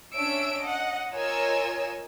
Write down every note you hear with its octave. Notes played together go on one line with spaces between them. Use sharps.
C#4 D4 E5 E6 D7
D#5 F#5
F4 A#4 C#5 D#5 G#5 E6